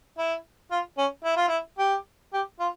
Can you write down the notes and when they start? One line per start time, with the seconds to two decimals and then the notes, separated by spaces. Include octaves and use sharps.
0.18 E4
0.71 F4
0.97 C#4
1.24 E4
1.36 F4
1.48 E4
1.78 G4
2.33 G4
2.59 F4